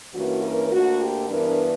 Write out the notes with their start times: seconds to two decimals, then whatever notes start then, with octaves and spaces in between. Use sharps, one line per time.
0.14 G2 E3 A#3 C#4 F#4
0.43 A#4
0.72 D2 D3 A#3 F#4
1.00 G4
1.29 G2 E3 B3 D4 A#4